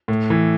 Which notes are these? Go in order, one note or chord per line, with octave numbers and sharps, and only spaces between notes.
A2
E3